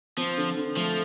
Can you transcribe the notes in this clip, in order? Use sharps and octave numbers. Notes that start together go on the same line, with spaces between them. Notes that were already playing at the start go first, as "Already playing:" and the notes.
F3 C4
D3
D3
F3 A3